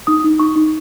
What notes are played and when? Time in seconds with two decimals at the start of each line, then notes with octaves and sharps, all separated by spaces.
0.07 D#4 D#6
0.24 D#4
0.39 D#4 C#6
0.56 D#4